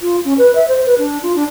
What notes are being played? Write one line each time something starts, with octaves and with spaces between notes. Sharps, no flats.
F4
C#4
B4
E5
C5
B4
D4
F4
D4